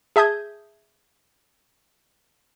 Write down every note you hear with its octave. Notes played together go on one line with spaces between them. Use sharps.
G#4 E5 A5 D#6 G6 G#6